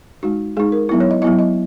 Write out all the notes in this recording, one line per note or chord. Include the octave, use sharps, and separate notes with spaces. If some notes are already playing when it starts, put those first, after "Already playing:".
G#3 D#4 F#4
G#3 D#4 G#4
A#4
F#3 B3 E4
C#5
D#5
F#3 B3 E4 D#5
D#5